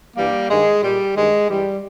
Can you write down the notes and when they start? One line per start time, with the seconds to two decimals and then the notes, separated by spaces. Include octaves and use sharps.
0.16 G2 E3 G3 A#3
0.49 G2 D#3 G#3
0.82 A#2 G3
1.16 G2 D#3 G#3
1.48 G2 E3 G3